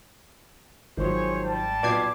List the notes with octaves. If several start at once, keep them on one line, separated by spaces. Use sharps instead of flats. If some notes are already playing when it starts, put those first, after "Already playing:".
G#1 D#3 F3 F#3 G#4 C5 C#5
G3 A5
B1 F4 B4 D5 D6 G#6 C7